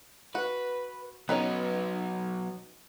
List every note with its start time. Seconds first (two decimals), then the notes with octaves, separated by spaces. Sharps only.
0.35 F#4 B4
1.29 F#3 B3 C#4 D#4 B4